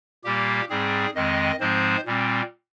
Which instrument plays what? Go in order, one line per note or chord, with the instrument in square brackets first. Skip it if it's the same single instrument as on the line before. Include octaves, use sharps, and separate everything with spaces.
[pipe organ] A#2 G3 A#3 G4
G#2 G3 C4 G#4
F2 D#3 G#3 C4 D#5
G#2 F3 G#3 C4 C5
A#2 G3 C4